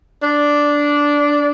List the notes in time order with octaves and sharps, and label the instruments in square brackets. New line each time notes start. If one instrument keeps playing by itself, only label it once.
[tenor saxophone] D4